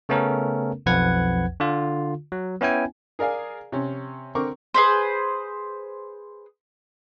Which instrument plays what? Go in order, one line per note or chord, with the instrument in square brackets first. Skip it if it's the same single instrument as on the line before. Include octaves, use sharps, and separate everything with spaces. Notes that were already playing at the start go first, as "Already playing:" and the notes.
[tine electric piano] C#3 A3 B3 C#4 A4 A#4
B1 F2 F3 B4 F#5 G#6
D3 F4
F#3
B3 C#4 E4 G5 G#5
[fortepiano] G#4 A#4 D5 F5 G#5
C3 C#4
D3 C4 A#4 C#6 D6
[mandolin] G#4 B4 C5